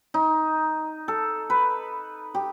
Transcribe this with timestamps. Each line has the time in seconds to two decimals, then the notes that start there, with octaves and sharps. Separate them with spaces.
0.14 D#4
1.08 A4
1.50 B4
2.35 G4